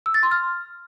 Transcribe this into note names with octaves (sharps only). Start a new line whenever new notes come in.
E6
A6
C6
F6